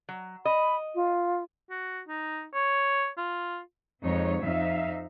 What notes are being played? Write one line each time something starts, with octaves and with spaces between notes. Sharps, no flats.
F#3
D#5 B5
F4
F#4
D#4
C#5
F4
F2 G#3 C4 D#4 C#5
F2 F3 D#4 E5 F5